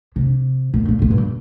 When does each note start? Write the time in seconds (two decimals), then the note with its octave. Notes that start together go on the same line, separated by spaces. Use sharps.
0.16 C3
0.74 A#2
0.88 A#2
1.02 A#2
1.11 G2